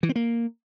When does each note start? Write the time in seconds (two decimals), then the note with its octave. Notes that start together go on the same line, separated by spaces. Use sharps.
0.03 E3
0.09 C4
0.16 A#3